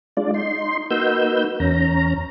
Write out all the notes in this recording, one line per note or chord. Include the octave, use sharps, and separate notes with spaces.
G#3 D4 F4 D5
D#4 C6
A#3 D#4 F#4 B4 E6 G6
E2 C#4 A#5